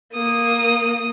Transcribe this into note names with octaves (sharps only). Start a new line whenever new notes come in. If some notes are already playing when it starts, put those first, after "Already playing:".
A#3 D#6